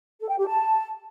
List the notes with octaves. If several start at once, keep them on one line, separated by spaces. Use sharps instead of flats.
A4
G5
G4
A5